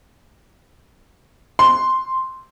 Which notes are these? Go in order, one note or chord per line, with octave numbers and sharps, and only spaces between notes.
C6